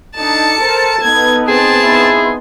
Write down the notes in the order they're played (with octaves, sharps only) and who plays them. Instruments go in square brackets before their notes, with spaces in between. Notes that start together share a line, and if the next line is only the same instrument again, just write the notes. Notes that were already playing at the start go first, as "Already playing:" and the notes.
[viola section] D4 D#4 [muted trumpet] A4 [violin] A5 C#7
[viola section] A#4 C5
[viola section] B3 D#4 B4 [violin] G#6
[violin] C4 A5 [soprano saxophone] G#4
[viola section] B3 D#4 C6 [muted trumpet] E4